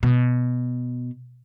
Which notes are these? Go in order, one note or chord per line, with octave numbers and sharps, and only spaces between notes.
B2